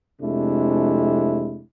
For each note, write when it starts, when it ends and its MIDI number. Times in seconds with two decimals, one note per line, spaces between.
0.22 1.62 41
0.22 1.62 48
0.22 1.62 56
0.22 1.62 57
0.22 1.62 62
0.22 1.62 64